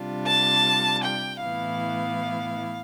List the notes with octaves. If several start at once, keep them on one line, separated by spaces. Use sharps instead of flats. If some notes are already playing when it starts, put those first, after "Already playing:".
Already playing: C3 G3 D4 F4
A5
G5
A2 E3 B3 E4 F5